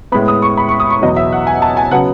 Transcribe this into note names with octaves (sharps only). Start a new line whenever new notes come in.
A2 G#3 B3 B5
D#6
C#6
B5
C#6
D#6
C#6
E2 B2 F#3 D#5
E5
F#5
G#5
A5
G#5
C#3 F#3 B3 F#5